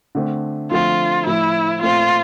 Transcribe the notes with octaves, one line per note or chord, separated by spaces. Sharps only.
D3 A3 C4
D3 F3 A3 C4 F4
A2 F3 A3 E4
A#2 A3 C4 F4